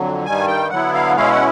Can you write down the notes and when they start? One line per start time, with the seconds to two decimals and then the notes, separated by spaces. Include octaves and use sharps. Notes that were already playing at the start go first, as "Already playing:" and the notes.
Already playing: F2 D3 F#3
0.25 G2 D#3 G3 G#5
0.48 G5
0.70 D3 F#3 B3 E4 F#5
0.94 F5
1.16 B2 G#3 C#4 E4 F5
1.31 F#5